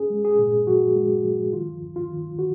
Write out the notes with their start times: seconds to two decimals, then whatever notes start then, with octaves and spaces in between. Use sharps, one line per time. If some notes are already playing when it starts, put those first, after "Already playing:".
Already playing: C#4 G#4
0.10 G#3
0.25 G#4
0.39 A#2
0.67 F3 F#4
0.96 G#3
1.25 F3
1.53 D#3 F4
1.82 D#2
1.96 F4
2.10 D#3
2.39 D#3 F#4